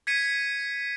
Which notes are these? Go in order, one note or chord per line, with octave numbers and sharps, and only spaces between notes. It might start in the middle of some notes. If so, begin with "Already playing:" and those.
G#6 B6 C#7 D#7